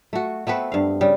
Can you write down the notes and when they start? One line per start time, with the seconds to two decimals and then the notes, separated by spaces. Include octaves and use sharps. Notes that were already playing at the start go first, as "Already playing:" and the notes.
0.13 A3 F#4
0.47 A3 B3 C4 B4
0.72 G2 F5
1.01 C#3 G3